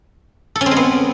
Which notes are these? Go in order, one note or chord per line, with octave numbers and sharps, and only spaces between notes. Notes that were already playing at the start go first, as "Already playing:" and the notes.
A4
C#4
C4
G#3
B3